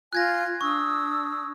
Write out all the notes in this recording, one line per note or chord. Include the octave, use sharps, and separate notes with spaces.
F4 G#5 F#6 G#6 A#6
D4 C#6 D#6 E6